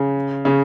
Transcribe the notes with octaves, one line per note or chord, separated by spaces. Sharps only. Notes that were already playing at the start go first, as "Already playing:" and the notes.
Already playing: C#3
C#3